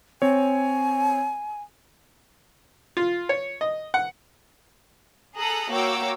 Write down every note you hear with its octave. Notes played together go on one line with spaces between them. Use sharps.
C4 C#5 G#5
F4
C#5
D#5
F#5
G#4 A4 A#5 D#6 F#6
A#3 F#4 C#5 G5 D6 E6